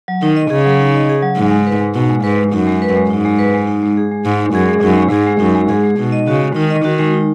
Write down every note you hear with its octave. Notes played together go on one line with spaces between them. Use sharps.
F#3
D#3 D#4
D#5
C#3 G#4
F#3
D#4
D#5
G#4
F#3
G#2 D#4
G#3
B4
G#3
B2 D#4
G#3
G#2 B4
G#3
F#2 D#4
G#3
B4
G#3
G#2 D#4
G#3
B4
G#3
D#4
G#3
G#4
G#3
G#2 D#4
G#3
F#2 G#4
G#3
F#2 D#4
G#3
G#2 G#4
G#3
F#2 D#4
G#3
G#2 G#4
G#3
B2 D#4
D#5
C#3 F#4
G#3
D#3 D#4
D#5
D#3 F#4
G#3
D#4